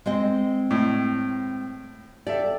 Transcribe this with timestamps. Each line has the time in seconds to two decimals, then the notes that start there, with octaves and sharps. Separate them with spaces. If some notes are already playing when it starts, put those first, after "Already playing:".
0.06 G#3 C4 D#5
0.71 A2
2.27 G4 A4 D5 E5